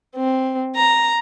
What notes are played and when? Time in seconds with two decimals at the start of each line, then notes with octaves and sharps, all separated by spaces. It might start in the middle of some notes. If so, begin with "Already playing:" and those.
0.16 C4
0.76 A#5